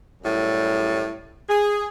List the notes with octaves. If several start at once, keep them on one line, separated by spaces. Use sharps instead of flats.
F#2 A2 G3
G#4